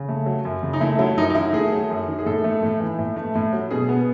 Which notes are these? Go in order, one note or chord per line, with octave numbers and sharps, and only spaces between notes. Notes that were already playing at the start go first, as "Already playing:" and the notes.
Already playing: C#3
A3
F#3
F#2
C#3
D#4
A3 E4
F#3 E4
F#2 D#4
D#4
D#3 E4
A3 G#4
F#3
F#2
D#3
G#4
A2 A4
A3
A2
E3
A2
A3
A2
F#3
B2 G#4
B3